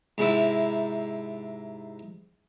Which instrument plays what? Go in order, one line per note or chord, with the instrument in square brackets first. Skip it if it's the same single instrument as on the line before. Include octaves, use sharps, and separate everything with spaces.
[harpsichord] G#2 C3 E4